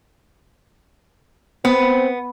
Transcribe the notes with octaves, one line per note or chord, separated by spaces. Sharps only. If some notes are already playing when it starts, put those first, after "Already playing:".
B3 C4